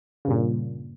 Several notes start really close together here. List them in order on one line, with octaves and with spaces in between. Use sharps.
C#3 G2 A#2